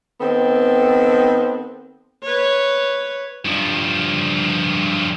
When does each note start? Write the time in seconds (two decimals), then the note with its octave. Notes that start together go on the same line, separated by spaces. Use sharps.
0.20 D#3 B3 C4 A4
2.23 B4 C#5
3.45 G2 F3